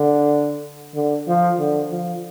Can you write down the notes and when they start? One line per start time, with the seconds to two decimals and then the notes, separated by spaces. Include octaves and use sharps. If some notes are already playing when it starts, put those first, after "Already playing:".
Already playing: D3
0.94 D3
1.27 F3
1.59 D3
1.90 F3